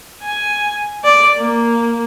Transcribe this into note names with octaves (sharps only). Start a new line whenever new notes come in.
G#5
D5
A#3